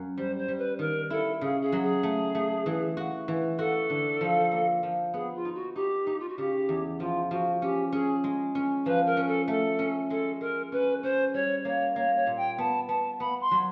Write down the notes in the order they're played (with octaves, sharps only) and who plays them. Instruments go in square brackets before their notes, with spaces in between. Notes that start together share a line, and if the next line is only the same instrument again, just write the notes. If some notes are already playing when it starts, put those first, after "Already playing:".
Already playing: [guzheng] F#2
[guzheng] G3 [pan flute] C5
[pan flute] C5
[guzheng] G3
[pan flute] B4
[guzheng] D#3 [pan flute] A#4
[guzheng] E4 [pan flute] A4
[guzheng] C#3 [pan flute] G#4
[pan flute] G#4
[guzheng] F#3
[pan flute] G#4
[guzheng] A3
A3
E3
F#4
E3
[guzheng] F#4 [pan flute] A4
[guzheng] D3
F3
A#3
F3
[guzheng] B3 [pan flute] G#4
[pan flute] F4
[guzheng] D#4
[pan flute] F#4
[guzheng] D#4 [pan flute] G4
[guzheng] D#4
[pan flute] F4
F#4
[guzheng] C#3 [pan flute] G4
[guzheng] E2
[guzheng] F3 [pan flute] F4
[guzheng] F3 [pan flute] F#4
[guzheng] C#4 [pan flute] G4
[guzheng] C#4 [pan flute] G#4
[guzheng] G#3
C#4
[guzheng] F3 [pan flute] B4
[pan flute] A#4
[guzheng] C#4
[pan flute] A4
[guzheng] A3 [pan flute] A4
[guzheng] C#4
[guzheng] G#3 [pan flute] A4
[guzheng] G#3 [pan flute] A#4
[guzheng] C#4 [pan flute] B4
[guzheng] C#4 [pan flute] C5
[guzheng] G3 [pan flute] C#5
[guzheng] A#3 [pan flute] C#5
[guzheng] A#3 [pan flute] C#5
[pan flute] C#5
[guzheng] A#2
[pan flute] G5
[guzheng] B3 [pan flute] A5
[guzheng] B3 [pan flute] A5
[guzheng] B3 [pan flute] B5
[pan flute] C6
[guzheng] F#3